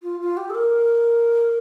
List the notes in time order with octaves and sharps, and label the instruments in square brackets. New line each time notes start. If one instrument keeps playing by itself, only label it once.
[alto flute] F4
F4
G4
A4
A#4